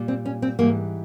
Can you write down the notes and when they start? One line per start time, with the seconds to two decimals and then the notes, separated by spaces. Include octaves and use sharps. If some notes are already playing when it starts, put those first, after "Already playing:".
Already playing: A#2 G3
0.08 C4
0.26 C#4
0.42 C4
0.59 G#2 E3 G3 A#3